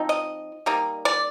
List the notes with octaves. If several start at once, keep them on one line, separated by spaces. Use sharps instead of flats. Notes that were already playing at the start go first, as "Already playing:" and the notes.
Already playing: F3 C4 D#4
D#5
G3 A#3 D#4
D5